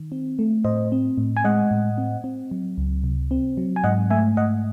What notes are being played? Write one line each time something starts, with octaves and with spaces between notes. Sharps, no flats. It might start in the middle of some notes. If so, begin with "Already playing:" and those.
Already playing: D#3
C4
A3
A2 C5 D#5
C4
A2
G#5
G#3 D#5 F#5
A2
C4
C4
F#3
C#2
C3
C4
F#3
G#5
G#2 D#5 F#5
A3 E5 G#5
G#2 D#5 F#5